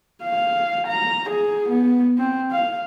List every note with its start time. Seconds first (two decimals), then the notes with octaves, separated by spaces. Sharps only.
0.23 F5
0.88 A#5
1.30 G#4
1.69 B3
2.18 C4
2.51 F5